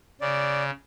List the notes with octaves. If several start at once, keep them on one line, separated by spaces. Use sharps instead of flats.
C#3 D5